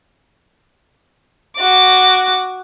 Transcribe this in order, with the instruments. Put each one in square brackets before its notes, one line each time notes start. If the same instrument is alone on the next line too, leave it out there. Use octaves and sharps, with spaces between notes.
[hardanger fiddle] F#4 D6